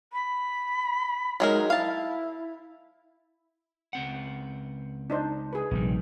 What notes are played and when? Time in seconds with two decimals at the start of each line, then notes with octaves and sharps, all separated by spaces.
0.13 B5
1.40 F#3 G#3 D#4 A#4
1.70 E4 F5 A5
3.93 C#2 C4 F#5
5.10 D4 D#4 C5
5.53 G#4 B4
5.71 A#1 C3 D#3 E3 G3